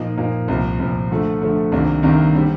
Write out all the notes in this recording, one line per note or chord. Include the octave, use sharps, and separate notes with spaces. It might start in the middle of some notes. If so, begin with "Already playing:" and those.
Already playing: A#2 F3 A#3 D#4
A#2 F3 A#3 D#4
C2 A#2 F3
C2 A#2 F3
D3 F3 A3
D3 F3 A3
C2 C3 D#3 A#3 D4
C2 C3 D#3 A#3 D4
D3 G3 C4